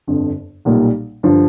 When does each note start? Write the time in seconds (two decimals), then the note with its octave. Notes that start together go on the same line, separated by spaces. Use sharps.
0.07 G1 F2 D3
0.65 B1 A#2 G3 A#3
1.23 G2 D3 F3